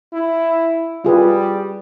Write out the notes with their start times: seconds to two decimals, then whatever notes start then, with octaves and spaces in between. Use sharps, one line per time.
0.13 E4
1.05 G3 F4 G#4 B4